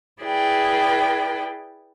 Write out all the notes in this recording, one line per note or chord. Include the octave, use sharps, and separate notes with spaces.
E4 G#4 B4 D5 G5